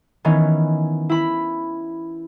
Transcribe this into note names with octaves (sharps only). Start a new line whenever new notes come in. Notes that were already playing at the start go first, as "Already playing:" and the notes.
D#3 E3 B3 C#4
E4 B5